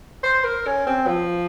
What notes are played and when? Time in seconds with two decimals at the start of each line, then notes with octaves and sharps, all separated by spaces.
0.23 C5
0.44 A#4
0.66 C#4
0.87 C4
1.07 F3